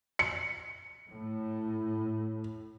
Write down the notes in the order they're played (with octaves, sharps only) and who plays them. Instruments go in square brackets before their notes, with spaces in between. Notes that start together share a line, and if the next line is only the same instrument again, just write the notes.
[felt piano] C#7
[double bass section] A2